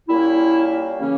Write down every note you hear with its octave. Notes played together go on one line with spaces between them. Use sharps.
A#2 G3 A#3 C#4 E4
C#3 E3 A#3 C#4